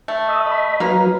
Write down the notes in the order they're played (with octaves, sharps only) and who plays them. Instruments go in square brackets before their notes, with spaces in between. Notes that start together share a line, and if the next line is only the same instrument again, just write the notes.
[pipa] A3
[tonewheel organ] D#5 E5
D#5 B5
[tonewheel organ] F#3 B4 [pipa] A#3 A#4